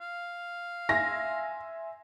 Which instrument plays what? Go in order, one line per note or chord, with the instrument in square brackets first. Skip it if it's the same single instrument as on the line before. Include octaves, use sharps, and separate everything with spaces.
[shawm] F5
[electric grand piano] E5 G#5 C6 [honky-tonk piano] A#6